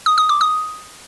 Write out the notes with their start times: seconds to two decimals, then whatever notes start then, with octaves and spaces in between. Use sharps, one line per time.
0.06 D#6
0.18 D#6
0.29 D6
0.41 D#6